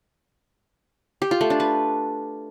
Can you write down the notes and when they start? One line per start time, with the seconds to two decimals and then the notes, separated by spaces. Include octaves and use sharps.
1.22 G4
1.31 F4
1.41 A3
1.50 D4
1.60 B4